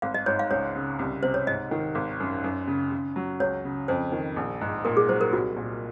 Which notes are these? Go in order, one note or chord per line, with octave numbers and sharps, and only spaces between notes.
G#1 F5
D#5
G#2 C#5
F5
C#2 C#5
C#3
C2
C3 C5
C#5
G#2 D#5
D#3
G#1
F#2
F#2
C#3
C#3
F#3
C#2 C#5
C#3
F2 C5
D#3
A#1
G#2
A#2 A#4
G#4
F#3 C5
A#4
C2 F#4
A#2